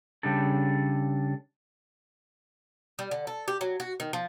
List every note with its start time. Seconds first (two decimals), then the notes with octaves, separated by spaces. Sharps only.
0.23 C#3 G3 D4 A4
2.99 G3
3.11 D3
3.27 A4
3.48 G4
3.61 F#3
3.80 F#4
4.00 D#3
4.13 F3